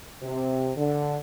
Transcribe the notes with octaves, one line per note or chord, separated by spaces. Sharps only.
C3
D3